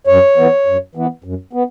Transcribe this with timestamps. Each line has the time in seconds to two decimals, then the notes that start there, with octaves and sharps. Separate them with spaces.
0.07 F#2 C#5
0.37 E3 B3
0.66 F#2
0.95 E3 B3
1.24 F#2
1.53 B3